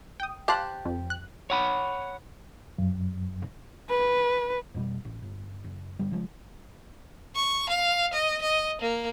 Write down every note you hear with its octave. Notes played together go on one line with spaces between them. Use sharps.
G5 D#6
G4 C5 F5 A5 F#6
F2
F#6
C#5 F#5 B5
F#2
B4
F2 B2 F#3 G3
A1
G1
F#1
G2 D3 G3
C#3 F3 G#3
C#6
F5
D#5
D#5
A#3